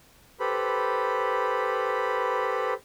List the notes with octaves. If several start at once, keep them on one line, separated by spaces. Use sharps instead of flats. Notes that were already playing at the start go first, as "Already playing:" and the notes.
G4 A4 B4 C5 B5